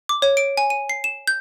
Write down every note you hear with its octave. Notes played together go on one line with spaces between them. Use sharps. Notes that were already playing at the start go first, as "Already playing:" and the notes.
D6
C#5
D7
G#5
D#7
C7
E7
G6